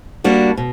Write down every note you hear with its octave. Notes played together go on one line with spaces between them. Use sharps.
G3 A#3 D4 F#4
B2